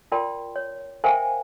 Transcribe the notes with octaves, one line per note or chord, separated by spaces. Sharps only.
F4 A#4 D5 G5 A5 C6
C#5
A#4 C5 E5 F5 G5 G#5